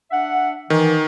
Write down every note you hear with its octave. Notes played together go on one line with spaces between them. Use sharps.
D4 E5 F#5
D#3 E3